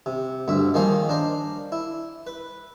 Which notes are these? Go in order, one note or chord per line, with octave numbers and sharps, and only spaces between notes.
C3
D2 G2 E5
D#3 F3 A#3 G#4 C5 C#5
D4 A#4 C5
E4
B4